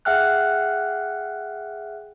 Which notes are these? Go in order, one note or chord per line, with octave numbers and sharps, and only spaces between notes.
G#4 E5 F#5 G5 F6 F#6